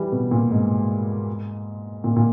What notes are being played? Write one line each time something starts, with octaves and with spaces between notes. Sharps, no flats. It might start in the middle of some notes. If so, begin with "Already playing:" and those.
Already playing: E3 G3
B2
A#2
G#2
A#2
A#2